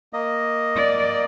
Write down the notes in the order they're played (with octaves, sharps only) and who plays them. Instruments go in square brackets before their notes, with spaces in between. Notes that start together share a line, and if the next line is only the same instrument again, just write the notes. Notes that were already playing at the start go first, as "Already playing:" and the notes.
[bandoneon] A#3 D#5
[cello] D5